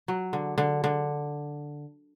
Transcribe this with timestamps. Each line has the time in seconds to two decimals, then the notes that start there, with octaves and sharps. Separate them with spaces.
0.08 F#3
0.33 D3
0.58 D3
0.84 D3